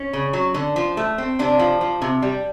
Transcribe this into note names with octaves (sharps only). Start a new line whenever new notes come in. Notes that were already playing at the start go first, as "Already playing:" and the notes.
Already playing: C#4
C#3
F#3
D3
F3
A3
C4
C3 D4
F3
F3
C3
G3